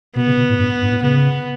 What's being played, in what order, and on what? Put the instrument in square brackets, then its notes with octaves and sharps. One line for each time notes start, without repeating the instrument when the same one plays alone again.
[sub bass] B2 [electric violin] B3
[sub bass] C#3
B2
A2
G2
G2
A2
[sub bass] C#3 [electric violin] B3